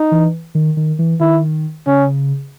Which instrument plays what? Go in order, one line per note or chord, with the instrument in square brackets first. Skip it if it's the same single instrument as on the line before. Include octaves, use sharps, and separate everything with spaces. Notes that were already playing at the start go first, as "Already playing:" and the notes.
Already playing: [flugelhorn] D#4
[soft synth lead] E3
D#3
D#3
E3
[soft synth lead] D#3 [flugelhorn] E4
[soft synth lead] C#3 [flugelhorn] C#4